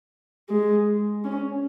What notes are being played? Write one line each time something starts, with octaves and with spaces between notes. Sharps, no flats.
G#3
C#4